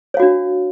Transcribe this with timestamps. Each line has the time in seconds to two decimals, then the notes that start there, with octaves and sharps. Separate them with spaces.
0.14 C#5
0.17 F5
0.20 F#4
0.22 D4